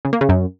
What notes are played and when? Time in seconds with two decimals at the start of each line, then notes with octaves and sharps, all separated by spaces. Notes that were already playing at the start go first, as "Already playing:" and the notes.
0.05 C#3
0.13 A#3
0.21 C#3
0.29 F#2